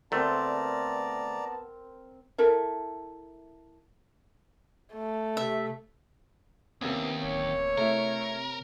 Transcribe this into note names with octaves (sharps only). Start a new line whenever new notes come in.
D2 A3 B3 C4 A#4 D5 A5 A#5
E4 A4 A#4 E5
A3
C3 E5
D#2 C3 A#3 B3 C#4
D1 C#5
C3 A3 E4 A#4